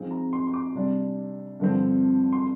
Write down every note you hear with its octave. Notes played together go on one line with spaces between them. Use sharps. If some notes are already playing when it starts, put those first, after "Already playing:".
Already playing: G#2 F3 G#3 C4
A#5
C6
C6
D6
C3 G3 D4
G2 D3 F3 C4
C6